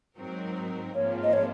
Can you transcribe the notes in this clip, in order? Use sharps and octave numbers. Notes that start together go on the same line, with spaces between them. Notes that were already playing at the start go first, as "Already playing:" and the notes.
G#2 F#3 C4 D#4 A#4
G#1 G#2 F3 A#3 F4 C#5
D#5
C#5